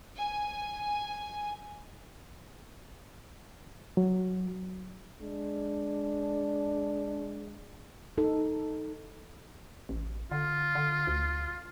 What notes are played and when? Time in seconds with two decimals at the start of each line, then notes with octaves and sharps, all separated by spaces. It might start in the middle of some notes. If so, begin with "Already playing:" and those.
0.19 G#5
3.97 F#3
5.22 G#3 D4
8.18 D#4 A4
9.89 A1
10.31 D3 F4
10.75 D3
11.07 D2